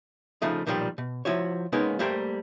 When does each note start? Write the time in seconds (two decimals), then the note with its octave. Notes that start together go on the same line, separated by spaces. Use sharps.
0.42 C#3 F3 A3 D#4
0.66 B1 A#2 D#3 F3 G3 G5
0.98 B2
1.25 F3 E4 F#4 C#5
1.73 G#3 A#3 B3 C#4 D#4
1.99 G3 A3 A#3 G4 C5